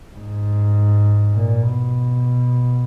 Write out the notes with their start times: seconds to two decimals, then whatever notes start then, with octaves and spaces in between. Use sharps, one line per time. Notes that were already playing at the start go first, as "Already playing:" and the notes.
0.15 G#2
1.34 A#2
1.63 B2